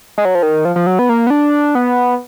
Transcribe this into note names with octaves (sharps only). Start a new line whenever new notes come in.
G#3
F#3
F3
D#3
F3
F3
F#3
B3
A#3
B3
D4
B3